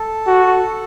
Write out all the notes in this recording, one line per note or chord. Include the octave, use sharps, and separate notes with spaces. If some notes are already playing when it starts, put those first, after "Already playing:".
Already playing: A4
F#4